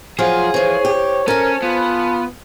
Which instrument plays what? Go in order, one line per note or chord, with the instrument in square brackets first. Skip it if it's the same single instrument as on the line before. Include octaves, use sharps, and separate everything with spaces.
[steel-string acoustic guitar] F3 F#3 F4 [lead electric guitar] G#4
[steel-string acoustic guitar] E3 F3 [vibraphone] C5 [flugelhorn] C#5
[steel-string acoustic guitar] G4
[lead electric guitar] C#4 [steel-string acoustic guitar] A4 G#5 [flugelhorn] A#4
[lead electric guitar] B3 [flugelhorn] F4